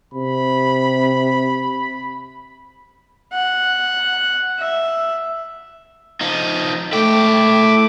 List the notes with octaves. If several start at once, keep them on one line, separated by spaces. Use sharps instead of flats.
C3 B5
F#5
E5
F3 D#4
A3 E4 G5 D6